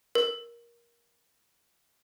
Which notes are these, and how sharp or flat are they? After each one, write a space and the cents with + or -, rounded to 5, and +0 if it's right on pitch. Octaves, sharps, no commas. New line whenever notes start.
A#4 +20